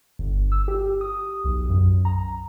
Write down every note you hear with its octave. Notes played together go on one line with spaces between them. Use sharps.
G1
E6
G4
D#6
B1
F#2
A#5